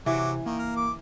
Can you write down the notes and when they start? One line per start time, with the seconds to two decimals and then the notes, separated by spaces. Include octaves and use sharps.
0.06 C3 E3 F#3 D6
0.46 D#3 A#3
0.59 A#4
0.76 D6